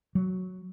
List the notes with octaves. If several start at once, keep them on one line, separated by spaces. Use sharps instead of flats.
F#3